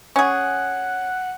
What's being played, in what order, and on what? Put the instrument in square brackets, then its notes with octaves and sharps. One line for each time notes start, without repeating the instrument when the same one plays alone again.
[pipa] C#4 G#4 [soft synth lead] F#5